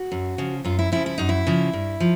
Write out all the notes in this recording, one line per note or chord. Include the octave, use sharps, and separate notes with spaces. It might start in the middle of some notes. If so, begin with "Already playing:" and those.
Already playing: F#4
F#2
C#3 F3
F#2 F4
E4
C#3 F3 E4
E4
F#2 D#4
E4
C#3 F3
G2
F3